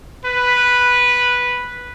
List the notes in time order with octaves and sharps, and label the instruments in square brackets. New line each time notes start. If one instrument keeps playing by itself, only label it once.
[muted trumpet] B4